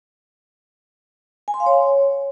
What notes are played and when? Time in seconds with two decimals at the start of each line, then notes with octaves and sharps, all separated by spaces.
1.48 G#5
1.54 C6
1.60 F5
1.66 C#5